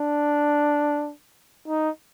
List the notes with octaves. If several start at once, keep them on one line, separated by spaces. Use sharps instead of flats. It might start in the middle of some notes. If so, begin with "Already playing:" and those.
Already playing: D4
D#4